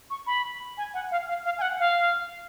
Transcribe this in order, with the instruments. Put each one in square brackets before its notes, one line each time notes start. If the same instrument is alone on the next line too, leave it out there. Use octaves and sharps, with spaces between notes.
[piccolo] C#6
B5
G#5
F#5
F5
F5
F5
G#5
F#5
F5